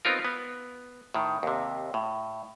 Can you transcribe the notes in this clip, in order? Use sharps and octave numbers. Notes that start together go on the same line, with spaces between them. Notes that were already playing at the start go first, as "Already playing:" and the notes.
B3 C4 D#4 F4 A#4
B3
A2 D#3
D#2 C3
A2